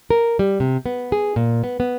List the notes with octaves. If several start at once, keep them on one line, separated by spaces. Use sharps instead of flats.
A#4
G3
C3
B3
G#4
A#2
B3
B3